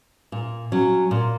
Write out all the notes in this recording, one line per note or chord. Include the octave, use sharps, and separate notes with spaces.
A#2
F#3 C#4
A#2